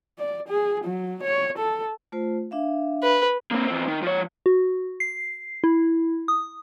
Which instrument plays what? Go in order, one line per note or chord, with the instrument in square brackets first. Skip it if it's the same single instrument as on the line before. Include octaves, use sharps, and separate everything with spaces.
[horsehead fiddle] D5
G#4
F#3
C#5
A4
[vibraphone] A3 F4 C5
D4 E5 F5
[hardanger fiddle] B4
[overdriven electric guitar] A#3 C4
E2 C4
D#3
F3 C#5
[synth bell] F#4
C7
E4
D#6